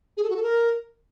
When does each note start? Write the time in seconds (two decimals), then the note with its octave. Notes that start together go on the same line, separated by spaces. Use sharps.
0.17 G#4
0.24 A4
0.30 F#4
0.36 A4
0.43 A#4